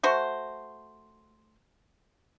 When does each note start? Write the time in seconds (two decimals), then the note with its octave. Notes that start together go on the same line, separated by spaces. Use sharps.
0.03 A3 F#4 C5